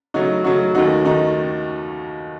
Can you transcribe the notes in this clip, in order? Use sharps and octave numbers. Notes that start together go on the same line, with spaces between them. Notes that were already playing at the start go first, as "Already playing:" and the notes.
C#3 F#3 A3 D#4 F#4
C#3 F#3 A3 D#4 F#4
D#2 D#3 A3 D#4 F#4
D#3 A3 D#4 F#4